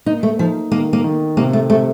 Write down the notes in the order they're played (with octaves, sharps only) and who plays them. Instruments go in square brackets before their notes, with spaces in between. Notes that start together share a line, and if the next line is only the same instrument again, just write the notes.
[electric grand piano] A#3 [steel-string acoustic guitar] D#4
[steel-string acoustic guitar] A3
[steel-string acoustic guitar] F3 [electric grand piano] D#4
[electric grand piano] D#3 [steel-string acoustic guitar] A#3
[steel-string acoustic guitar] A#3
[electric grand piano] D#3
[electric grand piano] C3 [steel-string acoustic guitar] A#3
[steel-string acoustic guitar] A3
[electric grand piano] C3 [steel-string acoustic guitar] A3